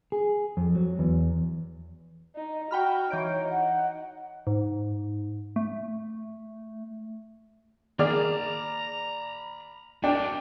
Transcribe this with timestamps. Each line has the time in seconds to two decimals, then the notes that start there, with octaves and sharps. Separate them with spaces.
0.12 G#4
0.57 F2
0.75 F#3
0.99 E2
2.36 D#4
2.71 F#4 G5 B5 F6
3.10 E3 D#4 C#5 G6 D7
3.50 F#5
4.47 G#2
5.56 A3
7.99 D#3 A#3 G#4 D5 A#5 B5 F6
10.04 D4 F#4 A#4 G5